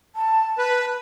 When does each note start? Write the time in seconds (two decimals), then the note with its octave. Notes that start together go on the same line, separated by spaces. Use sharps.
0.16 A5
0.58 B4